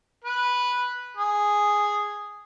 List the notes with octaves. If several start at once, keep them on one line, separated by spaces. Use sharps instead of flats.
B4
G#4